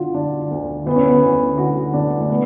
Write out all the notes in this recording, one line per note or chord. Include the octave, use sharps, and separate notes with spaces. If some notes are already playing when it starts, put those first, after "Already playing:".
Already playing: D3 F4 F#4
D3 D4
D2
D2 B3
C#4
B3
D2
D3 F#4
D3 D4
A3
B3